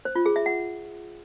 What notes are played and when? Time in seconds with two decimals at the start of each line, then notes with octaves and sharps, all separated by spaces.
0.05 C5
0.15 F4
0.26 G#4
0.36 E5
0.46 F#5